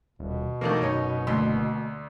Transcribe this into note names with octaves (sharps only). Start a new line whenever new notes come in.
D#1 B2
E2 D#3 A3 A#3
F#1 D#4 C#5
D2 A3 A#3 C6